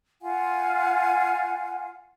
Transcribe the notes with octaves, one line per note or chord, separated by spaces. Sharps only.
F4 F5 F#5 G#5